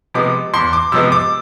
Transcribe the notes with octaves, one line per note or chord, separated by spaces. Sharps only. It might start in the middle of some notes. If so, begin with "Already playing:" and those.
C3 F3 G#3 B3 D6
E2 C6
D6
C3 F3 G#3 B3 E6
D6